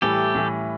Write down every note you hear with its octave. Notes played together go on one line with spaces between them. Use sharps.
A2 E3 G3 G4 A4
A2 E3 G3